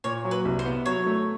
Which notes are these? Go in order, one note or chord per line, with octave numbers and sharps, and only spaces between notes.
A#2 C#5
F#3
B4
C2
C5
B3
F#3 C#5
A3